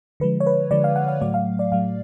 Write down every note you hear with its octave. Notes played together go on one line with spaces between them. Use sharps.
D3 F3 G#3 B4
C#5
B4
D3 F3 G#3 D5
F5
F#5
F5
A2 F#3 A3 D5
F5
D5
A2 F#3 A3 F5